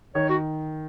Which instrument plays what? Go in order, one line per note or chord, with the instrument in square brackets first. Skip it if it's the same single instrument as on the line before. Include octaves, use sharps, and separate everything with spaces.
[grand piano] D#3 [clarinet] C#5
[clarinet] F#4